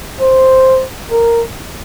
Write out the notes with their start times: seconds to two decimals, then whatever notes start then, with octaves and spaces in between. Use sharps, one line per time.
0.20 C5
1.11 A#4